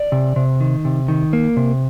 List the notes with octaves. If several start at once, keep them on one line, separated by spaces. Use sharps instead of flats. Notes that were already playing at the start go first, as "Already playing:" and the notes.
Already playing: D5
C3
C3
D#3
C3
D#3
A#3
C3